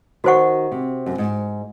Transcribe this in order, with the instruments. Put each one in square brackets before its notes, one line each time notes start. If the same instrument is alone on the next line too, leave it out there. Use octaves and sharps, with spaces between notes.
[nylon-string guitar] D#3 [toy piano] F#4 C5 F#5 C#6
[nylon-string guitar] C3
F#2
G#2